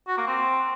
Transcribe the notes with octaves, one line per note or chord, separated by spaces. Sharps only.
F#4
A#3
C4